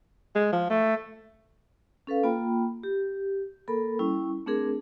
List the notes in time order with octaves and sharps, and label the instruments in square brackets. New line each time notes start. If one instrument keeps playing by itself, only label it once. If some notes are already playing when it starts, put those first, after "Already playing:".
[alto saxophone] G#3
F3
A3
[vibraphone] C#4 A4 B4 F5
A#3 F4 G5 A#5 B5
G4
A#3 A4 A#4 B5
G3 C#4 E4 C#6
A3 C4 D4 G#4 A#4